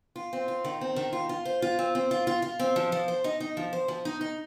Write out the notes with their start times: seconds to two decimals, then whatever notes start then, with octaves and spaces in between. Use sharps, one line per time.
0.16 F4
0.33 C4
0.48 F4
0.65 D#3
0.81 C4
0.96 D#3
1.13 F4
1.29 F4
1.45 C5
1.62 F4
1.79 C4
1.95 C4
2.11 F4
2.27 F4
2.42 F4
2.59 C4
2.76 F3
2.92 F3
3.08 C5
3.24 D#4
3.40 D#4
3.57 F3
3.73 C5
3.88 F3
4.05 D#4
4.21 D#4